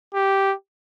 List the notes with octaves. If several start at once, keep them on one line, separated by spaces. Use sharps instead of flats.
G4